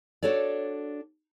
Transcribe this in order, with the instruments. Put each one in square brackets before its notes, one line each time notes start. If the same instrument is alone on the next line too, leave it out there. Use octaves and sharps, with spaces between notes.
[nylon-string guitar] D4 F#4 A4 C#5 D5